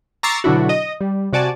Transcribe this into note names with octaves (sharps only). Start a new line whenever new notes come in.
A#5 C#6 D6 E6 A6 C7
B2 D3 F#3 D4 E4 F#4
D#5
G3
C3 F#4 D5 G#5 A5